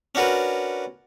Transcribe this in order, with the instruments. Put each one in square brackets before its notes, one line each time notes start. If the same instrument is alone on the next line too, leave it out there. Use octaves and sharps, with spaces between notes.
[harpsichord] C#4 D4 F#4 A#4 B4